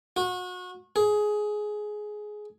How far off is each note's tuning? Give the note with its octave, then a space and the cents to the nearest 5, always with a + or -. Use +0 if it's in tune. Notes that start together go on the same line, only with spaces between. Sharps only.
F#4 -30
G#4 +15